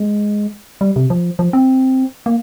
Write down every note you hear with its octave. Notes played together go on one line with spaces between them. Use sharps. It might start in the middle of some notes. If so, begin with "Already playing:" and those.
Already playing: G#3
G3
C3
F3
F3
C4
A#3